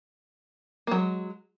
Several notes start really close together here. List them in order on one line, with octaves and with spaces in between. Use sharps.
A#3 F#3 G#3